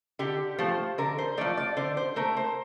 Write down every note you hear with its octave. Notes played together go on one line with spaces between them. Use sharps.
D3 G4
F3 A3 C5
D3 A#4
C5
F3 A3 D5
D5
D3 C5
C5
A3 A#4
C5